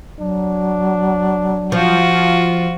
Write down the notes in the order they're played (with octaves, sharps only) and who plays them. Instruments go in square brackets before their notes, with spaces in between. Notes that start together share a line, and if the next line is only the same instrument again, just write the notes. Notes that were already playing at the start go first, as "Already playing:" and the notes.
[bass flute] F#3 [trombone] D4
[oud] F3 [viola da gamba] F4 F#4